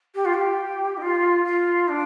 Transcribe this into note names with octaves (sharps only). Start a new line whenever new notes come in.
G4
F4
G4
D#4
F4
F4
D4